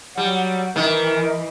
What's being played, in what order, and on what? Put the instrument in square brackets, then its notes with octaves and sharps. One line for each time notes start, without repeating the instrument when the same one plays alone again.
[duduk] F#3 [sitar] G3 [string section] F#5
[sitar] D#3 [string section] E3 [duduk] A#4